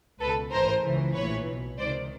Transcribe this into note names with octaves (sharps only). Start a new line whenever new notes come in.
C#2 B2 A4 B4
A1 G#2 E3 A#4 C5
C#2 C#3 E3
A#1 A2 E3 B4 C#5
B1 B2
C#2 C3 D#3 C5 D5